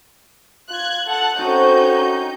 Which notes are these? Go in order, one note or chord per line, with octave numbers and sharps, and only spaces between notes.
F4 F#6 G#6
A4 F#5 A5 F#6
C4 C#4 D#4 F#4 A4 G6